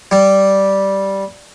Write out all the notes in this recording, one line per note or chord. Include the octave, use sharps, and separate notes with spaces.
G3